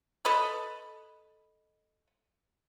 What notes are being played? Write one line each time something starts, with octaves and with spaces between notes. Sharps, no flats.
A4 B4 D#5 B5